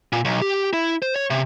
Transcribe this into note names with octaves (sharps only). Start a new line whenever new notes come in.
A#2
B1
G4
E4
C5
C#5
C3